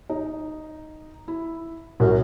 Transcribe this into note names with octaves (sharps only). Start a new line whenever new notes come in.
D#4
E4
C2 F#2